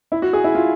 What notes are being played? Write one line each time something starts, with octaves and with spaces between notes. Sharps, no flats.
E4
F#4
G#4
E4
F4